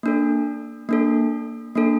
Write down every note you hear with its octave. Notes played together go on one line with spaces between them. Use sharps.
A#3 D4 A4
A#3 D4 A4
A#3 D4 A4